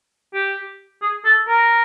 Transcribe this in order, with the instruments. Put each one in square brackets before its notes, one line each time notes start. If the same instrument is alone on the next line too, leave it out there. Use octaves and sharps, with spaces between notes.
[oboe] G4
G#4
A4
A#4